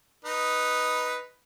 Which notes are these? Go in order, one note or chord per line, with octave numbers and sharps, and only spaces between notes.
D#4 B4